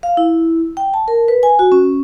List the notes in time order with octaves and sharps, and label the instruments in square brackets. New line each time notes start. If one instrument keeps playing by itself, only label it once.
[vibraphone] F5
E4
G5
A5
A#4
B4
G#5
F#4
C#4